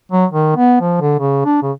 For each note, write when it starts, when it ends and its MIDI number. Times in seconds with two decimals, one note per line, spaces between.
0.12 0.25 54
0.31 0.52 51
0.56 0.78 59
0.81 1.00 53
1.01 1.15 50
1.19 1.43 49
1.45 1.60 62
1.62 1.72 49